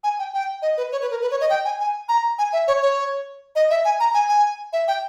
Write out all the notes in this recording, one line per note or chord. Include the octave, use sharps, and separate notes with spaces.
G#5
G5
G5
D#5
B4
C#5
B4
A#4
B4
C#5
D#5
G5
G#5
G#5
A#5
G#5
E5
C#5
C#5
D#5
E5
G#5
A#5
G#5
G#5
E5
G5